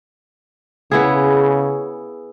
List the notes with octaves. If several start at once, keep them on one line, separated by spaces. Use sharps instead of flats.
C#3 B3 E4 G#4